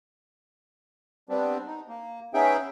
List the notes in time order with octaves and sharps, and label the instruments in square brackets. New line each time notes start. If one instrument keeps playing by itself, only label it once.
[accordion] G3 B3 C4 D4
D#4
A#3
B3 C#4 D#4 G#4 E5 G5